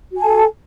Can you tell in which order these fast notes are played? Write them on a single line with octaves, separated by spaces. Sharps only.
F#4 G#5 A5 A4